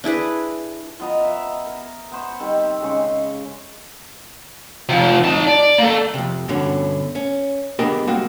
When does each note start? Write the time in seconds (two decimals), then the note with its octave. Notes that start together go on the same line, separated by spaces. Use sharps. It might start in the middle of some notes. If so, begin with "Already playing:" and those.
0.04 D4 E4 G#4 B4
1.00 F3 B3 D#5 A#5
1.21 E5
1.66 A#4
2.12 B3 C5 C#6
2.40 D#3 G3 C4
2.82 C#3 G#3 C#6
4.89 C3 F3
5.25 D#4 A5
5.47 D5
5.78 A#3 A4
6.14 F2 C3
6.48 G2 B2 D3 C#4
7.15 C#4
7.79 B3 D4 G4 G#4 A#4 D#5
8.07 G3 G#3 A#3 C4 F#4